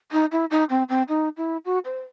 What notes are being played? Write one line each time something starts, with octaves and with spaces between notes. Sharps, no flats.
D#4
E4
D#4
C4
C4
D#4
E4
F#4
C5